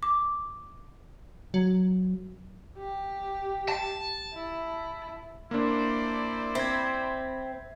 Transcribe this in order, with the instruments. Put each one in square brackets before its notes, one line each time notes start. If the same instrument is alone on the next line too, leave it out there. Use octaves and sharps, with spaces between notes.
[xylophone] D6
[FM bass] F#3
[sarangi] G4
[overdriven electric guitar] A5
[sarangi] E4
[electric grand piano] A#3 D4 [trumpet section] E4 C5 D5
[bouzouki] C4 [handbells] E5 [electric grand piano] B5 G#6